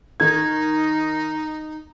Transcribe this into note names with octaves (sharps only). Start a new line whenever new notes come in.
D#3 D#4 G#6